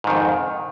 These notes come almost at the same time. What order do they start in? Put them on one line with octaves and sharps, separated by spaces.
G#2 D#3 F2